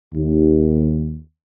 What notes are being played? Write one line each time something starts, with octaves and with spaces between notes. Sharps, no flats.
D#2